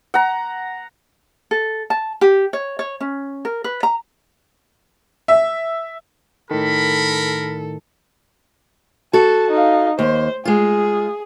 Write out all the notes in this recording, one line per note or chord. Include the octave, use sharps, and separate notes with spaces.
F#5 A#5
A4
A5
G4
C#5
C#5
C#4
A#4
B4
A#5
E5
A2 D#3 A4 A#4 B5
F#4 A4 A5
D#4 F5
D#2 C5
G#3 F4 G#4